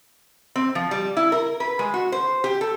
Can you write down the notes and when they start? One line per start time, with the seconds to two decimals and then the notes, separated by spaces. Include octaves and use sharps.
0.56 C4
0.75 F3
0.91 G3
1.17 E4
1.32 A#4
1.60 B4
1.79 G#3
1.94 F#4
2.12 C5
2.44 G4
2.61 A4